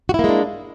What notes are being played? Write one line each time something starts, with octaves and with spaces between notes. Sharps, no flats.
G#3 A#3 D4 E4 F#4